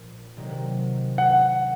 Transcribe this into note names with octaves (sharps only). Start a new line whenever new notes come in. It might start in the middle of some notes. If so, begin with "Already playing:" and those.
Already playing: A#1 A#2
C3 D#3 F#3 A#3
F#5